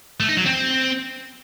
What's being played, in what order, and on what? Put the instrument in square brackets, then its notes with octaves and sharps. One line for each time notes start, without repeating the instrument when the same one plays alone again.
[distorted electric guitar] A3
D#4
F#3
C4